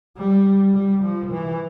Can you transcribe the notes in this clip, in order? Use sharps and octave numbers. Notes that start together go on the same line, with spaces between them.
G3
G3
F3
E3